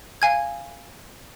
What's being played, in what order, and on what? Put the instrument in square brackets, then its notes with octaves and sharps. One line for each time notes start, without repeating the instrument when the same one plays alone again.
[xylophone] F5 G#5 G#6